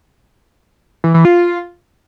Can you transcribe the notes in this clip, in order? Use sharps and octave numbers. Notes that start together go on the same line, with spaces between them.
E3
E3
F4